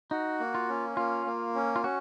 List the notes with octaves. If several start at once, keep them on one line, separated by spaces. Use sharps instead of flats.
D#4 F#4
A#3
F4
C#4
A#3 F4
A#3
C#4
F4
C#4 F#4